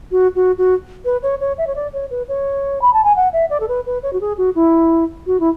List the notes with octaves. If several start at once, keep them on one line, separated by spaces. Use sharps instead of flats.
F#4
F#4
F#4
B4
C#5
C#5
E5
C#5
D5
C#5
B4
C#5
B5
A5
G#5
F#5
E5
D5
A4
B4
B4
C#5
F#4
G#4
F#4
E4
F#4
E4